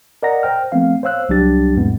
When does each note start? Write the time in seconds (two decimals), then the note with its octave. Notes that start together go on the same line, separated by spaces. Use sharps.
0.23 A#4 D5 D#5 F#5 A#5 A#6
0.43 C5 G5 F6
0.72 F3 A3 B3 C4 F5
1.03 C5 C#5 F5 E6 F#6
1.29 C2 F#3 G3 D4 G4 A6
1.76 F2 A2 G#3 B3